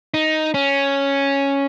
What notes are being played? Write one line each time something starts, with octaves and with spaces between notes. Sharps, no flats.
D#4
C#4